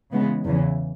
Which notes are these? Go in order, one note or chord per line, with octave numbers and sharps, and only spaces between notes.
C#3 E3 G#3 B3
E2 C#3 E3